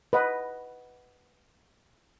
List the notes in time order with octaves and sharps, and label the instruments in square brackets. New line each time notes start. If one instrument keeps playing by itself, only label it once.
[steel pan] B4 D#5 F#5